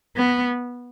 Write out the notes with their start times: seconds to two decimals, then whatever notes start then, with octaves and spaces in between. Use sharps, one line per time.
0.16 B3